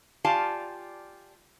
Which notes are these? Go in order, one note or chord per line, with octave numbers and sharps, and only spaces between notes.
F4 G4 D5 F5 G#5 A5